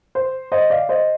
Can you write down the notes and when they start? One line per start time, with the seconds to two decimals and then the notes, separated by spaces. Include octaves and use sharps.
0.15 C5
0.52 C5 D#5
0.70 D5 F5
0.89 C5 D#5